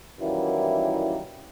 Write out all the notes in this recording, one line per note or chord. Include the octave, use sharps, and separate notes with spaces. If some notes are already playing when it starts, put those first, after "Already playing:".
F#2 D#3 E3 G3 A#3 E4